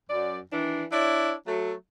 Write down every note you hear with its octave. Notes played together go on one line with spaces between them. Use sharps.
F#2 D5
D#3 E3 D4
D4 E4 C#5 D5
F#3 A3